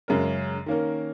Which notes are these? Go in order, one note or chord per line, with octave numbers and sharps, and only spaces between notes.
F#2 C#3 G#3 C#4 A#4
D#3 A#3 C#4 A#4